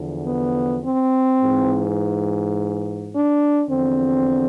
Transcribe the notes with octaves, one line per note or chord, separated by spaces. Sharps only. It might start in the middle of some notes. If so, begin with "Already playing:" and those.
Already playing: E2 D3 F3
B3
C4
G#2 E3
D4
E2 D3 F3 C4